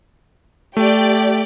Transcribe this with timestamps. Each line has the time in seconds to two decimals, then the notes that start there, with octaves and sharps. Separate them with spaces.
0.77 A3 G4 D5 G5